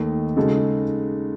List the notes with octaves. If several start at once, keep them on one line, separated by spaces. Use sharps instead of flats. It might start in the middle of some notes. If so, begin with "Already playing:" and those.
Already playing: D#2 D#3 A3
C#3 G#3 D#4 F#4 A4